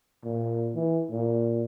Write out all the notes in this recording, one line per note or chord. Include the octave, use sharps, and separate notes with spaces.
A#2
E3
A#2